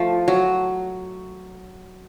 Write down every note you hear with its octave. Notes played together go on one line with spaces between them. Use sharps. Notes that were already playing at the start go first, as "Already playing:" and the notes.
Already playing: F3 A3
F#3